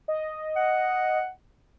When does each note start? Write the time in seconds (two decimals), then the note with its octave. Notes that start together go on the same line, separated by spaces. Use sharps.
0.08 D#5
0.56 F#5